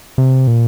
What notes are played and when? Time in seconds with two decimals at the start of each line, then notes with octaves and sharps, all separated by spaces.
0.18 C3
0.47 A#2